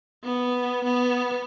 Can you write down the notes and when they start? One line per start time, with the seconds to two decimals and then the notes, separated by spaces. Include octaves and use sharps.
0.24 B3
0.84 B3